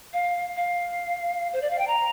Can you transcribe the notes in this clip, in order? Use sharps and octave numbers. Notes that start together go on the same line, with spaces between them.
F5
F5
C5
D5
F5
G5
A#5